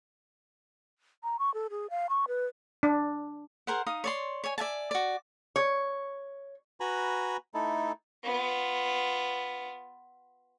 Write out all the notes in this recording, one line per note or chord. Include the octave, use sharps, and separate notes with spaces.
A#5
C#6
A4
G#4
F5
C#6
B4
D4
G#4 A#4 C5 F#5
D#4 F5 D#6
C#5 D5 C6
C#5 G#5
D5 E5 G#5 A5
F#4 D5
C#5
F#4 B4 G#5 A#5 B5
A3 D#4 E4 A4
B3 F4